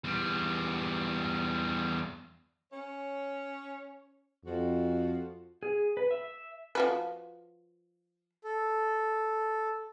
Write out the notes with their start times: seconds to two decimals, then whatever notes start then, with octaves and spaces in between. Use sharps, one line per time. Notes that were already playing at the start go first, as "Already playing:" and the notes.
0.04 E2 G3
2.72 C#4 C#5
4.45 F2 F3 F#4
5.63 G#4
5.97 B4
6.11 E5
6.75 F3 F#4 B4
8.44 A4